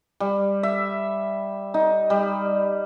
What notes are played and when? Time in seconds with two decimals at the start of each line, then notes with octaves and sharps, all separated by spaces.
0.20 G3
0.63 E5
1.74 D#4
2.10 G3